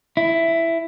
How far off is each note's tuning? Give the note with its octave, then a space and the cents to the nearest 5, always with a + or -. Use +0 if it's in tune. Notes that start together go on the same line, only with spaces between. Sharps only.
E4 +10